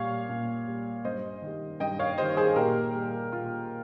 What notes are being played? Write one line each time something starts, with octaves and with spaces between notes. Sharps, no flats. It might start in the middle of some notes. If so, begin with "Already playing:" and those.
Already playing: A#2 G3 C#5 F5
A#2
G3
G2 C5 D#5
D#3 G3
G2 D#5 G5
C#5 F5
D#3 G3 C5 D#5
G#4 C5
A#2 G4 A#4
G3
A#2 F4